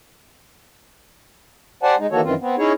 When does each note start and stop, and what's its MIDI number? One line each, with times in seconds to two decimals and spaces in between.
1.83 1.95 67
1.83 1.95 72
1.83 1.95 74
1.83 1.95 78
1.83 1.95 80
1.83 1.95 81
1.99 2.07 56
1.99 2.07 63
2.12 2.21 51
2.12 2.21 52
2.12 2.21 58
2.12 2.21 66
2.12 2.21 69
2.12 2.21 73
2.24 2.34 42
2.24 2.34 51
2.24 2.34 52
2.24 2.34 60
2.24 2.34 65
2.41 2.56 59
2.41 2.56 60
2.58 2.72 61
2.58 2.72 63
2.58 2.72 64
2.58 2.72 68
2.58 2.72 73